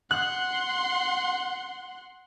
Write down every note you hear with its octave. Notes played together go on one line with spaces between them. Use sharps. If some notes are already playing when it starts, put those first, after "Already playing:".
F#5 C6 F#6